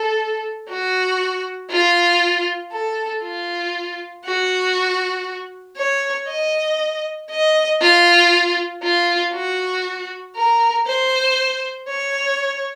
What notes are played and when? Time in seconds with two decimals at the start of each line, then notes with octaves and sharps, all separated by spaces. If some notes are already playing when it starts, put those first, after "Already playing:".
Already playing: A4
0.69 F#4
1.70 F4
2.72 A4
3.23 F4
4.25 F#4
5.77 C#5
6.28 D#5
7.31 D#5
7.81 F4
8.83 F4
9.33 F#4
10.36 A#4
10.87 C5
11.89 C#5